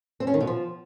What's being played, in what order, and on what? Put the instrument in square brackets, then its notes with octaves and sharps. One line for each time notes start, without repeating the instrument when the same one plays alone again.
[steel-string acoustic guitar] C4
C#4
D#3
B2
F3